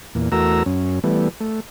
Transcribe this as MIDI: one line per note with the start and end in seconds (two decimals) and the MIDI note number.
0.15 0.29 40
0.15 0.29 46
0.32 0.63 40
0.32 0.63 57
0.32 0.63 66
0.32 0.63 70
0.32 0.63 82
0.32 0.63 88
0.66 0.99 42
0.66 0.99 61
1.04 1.29 52
1.04 1.29 55
1.04 1.29 57
1.04 1.29 59
1.40 1.60 57